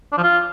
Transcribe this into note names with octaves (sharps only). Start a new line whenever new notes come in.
D4
F3
F4